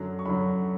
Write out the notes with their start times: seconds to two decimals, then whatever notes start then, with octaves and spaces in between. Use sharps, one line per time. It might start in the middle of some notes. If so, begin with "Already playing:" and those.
Already playing: F#2 D3 F#3
0.19 C#6
0.25 F#2 D3 F#3 B5